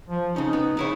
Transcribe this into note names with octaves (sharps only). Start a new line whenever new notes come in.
F3
C#3 C#4 D#4
B3
C#3 D#4 E4 C#5